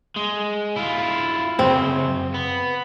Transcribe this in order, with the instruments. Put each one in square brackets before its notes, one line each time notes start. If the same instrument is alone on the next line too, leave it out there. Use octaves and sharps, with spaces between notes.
[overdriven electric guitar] G#3
E4 F4
[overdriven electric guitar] F#2 C#3 [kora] C4
[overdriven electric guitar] B3